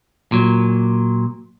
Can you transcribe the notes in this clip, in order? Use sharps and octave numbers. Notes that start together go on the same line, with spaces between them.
A#2 F#3